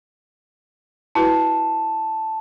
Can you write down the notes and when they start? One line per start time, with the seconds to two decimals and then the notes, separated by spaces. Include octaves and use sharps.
1.15 E4 F#4 B4 A5